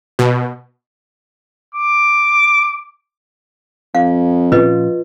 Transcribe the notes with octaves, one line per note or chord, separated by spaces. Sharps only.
B2
D6
F2 F5
A#2 F3 C#4 F4 B4 D#5